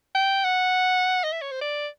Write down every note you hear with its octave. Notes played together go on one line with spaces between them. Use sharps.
G5
F#5
D#5
E5
C#5
C5
D5